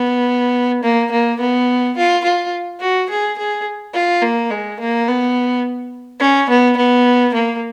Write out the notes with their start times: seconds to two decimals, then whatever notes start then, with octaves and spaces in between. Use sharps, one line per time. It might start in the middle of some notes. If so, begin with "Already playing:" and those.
Already playing: B3
0.84 A#3
1.11 A#3
1.41 B3
1.97 F4
2.25 F4
2.81 F#4
3.10 G#4
3.38 G#4
3.94 F4
4.22 A#3
4.51 G#3
4.80 A#3
5.08 B3
6.20 C#4
6.50 B3
6.77 B3
7.34 A#3